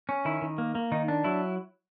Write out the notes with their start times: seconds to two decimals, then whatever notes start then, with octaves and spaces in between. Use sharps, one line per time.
0.09 C#4
0.25 D#3 E4
0.42 D#3
0.58 A#3
0.75 A#3
0.92 D#3 D#4
1.08 D4
1.24 F#3 E4